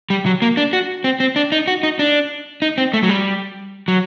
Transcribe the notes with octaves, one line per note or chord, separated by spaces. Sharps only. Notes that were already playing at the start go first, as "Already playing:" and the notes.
G3
F#3
A#3
D4
F#4
C4
C4
D4
D#4
F#4
D#4
D4
D#4
C4
A3
F#3
G3
F#3